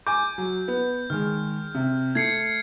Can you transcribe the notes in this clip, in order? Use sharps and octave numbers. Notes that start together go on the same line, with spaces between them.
G#5 D6 G6
F#3
B3
D#3 G#3 F6
C3
A3 G#6 C7 C#7